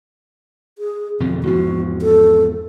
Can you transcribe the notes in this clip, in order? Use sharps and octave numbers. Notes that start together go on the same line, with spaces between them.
G#4
F2 B2 D3 C4
E2 G#2 F3 F#4
A4